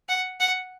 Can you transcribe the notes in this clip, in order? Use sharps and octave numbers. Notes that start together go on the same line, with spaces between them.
F#5
F#5